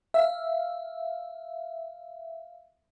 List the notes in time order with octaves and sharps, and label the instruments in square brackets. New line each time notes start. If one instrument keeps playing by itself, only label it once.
[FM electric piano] E5 F5